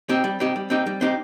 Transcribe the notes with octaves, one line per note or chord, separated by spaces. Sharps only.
C4 D#4 G4
G3
C4 D#4 G4
G3
C4 D#4 G4
G3
C4 D#4 G4